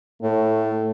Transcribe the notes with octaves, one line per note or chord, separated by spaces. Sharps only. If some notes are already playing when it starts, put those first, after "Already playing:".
A2 A3